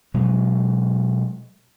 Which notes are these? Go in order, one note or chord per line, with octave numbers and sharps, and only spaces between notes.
B2 F#3 G#3